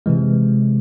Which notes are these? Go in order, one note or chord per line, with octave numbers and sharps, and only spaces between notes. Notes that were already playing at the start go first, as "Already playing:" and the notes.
C3 E3 G#3